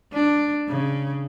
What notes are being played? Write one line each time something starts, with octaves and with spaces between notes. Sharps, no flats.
D4
C#3